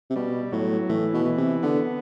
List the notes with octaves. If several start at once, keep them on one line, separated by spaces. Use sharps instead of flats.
C3
B2 G3
A2 F#3
A2 E3
B2
E3
C3
D3 B3